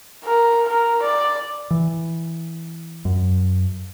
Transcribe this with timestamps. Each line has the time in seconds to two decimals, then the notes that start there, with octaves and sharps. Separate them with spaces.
0.24 A#4
0.68 A#4
1.02 D5
1.71 E3
3.05 F#2